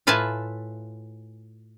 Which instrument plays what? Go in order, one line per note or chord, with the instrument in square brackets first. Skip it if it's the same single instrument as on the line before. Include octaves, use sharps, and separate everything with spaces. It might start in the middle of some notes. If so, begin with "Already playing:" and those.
[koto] A2 F4 B4 E5 G#5 A5